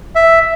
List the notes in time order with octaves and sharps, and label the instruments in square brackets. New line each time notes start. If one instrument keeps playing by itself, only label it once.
[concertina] E5